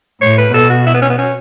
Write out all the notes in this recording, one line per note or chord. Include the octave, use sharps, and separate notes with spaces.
A2 C#5
B4
B2 A4
F#4
E4
B3
C#4
B3
C#4